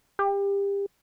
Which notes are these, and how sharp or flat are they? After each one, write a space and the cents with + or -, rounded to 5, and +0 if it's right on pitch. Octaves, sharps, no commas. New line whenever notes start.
G4 +30